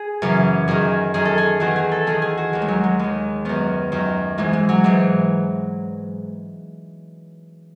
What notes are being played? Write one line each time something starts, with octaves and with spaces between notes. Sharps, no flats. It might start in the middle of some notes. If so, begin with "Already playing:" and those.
Already playing: G#4
F#2 C#3 E3
F#2 D#3 G#4
F#2 D#3 G#4
A4
G#4
E2 D#3 F#4
G#4
A4
E2 D#3 G#4
G#4
F#4
D#2 D#3
G#3
F#3
G#3
D#2 D#3
F#2 D#3 B3
F#2 D#3
G#2 E3 G#3
G#3
F#3
G#2 E3